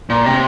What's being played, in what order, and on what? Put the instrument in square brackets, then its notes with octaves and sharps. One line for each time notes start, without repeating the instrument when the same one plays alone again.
[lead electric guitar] A#2
C3